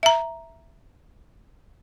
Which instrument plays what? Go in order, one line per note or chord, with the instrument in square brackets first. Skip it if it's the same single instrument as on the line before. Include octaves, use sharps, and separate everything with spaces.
[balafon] E5 A#5